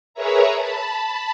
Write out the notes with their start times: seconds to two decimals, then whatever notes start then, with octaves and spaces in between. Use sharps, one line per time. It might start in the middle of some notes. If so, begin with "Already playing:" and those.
0.14 G#4 A#4 B4 C#5 E5 A#5
0.55 A5 B5